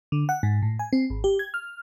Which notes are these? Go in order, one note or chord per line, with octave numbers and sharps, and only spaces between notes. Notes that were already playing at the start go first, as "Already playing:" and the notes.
D3
F#5
G#2
A2
G#5
C4
G#1
G4
G#6
F6